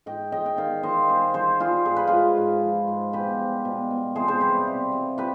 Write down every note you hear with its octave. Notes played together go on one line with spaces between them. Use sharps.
G#2 D#5 G5
G#3 D#5 G5
G5
D#3 D5 F5
D#3 C5 D#5
G3 G#4 C5
G3 G#4 C5
G3 F4 G#4
G#2 G#4
B4
G#3 F4 G#4
G#2
F3
G#2
B2 G4 B4
G3
B2
B2
C3 G#4 C5
G#4 C5
G3 G4 B4
C3
G3
G3 G4 B4